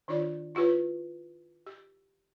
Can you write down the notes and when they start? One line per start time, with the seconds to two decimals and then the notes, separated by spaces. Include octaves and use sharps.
0.08 D#3 D4 F4 C#5 D5
0.55 E4 F4 G4 B4 C#5
1.66 G4